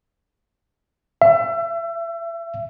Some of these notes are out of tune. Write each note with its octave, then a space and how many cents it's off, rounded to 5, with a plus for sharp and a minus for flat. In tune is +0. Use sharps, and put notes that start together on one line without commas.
E5 +30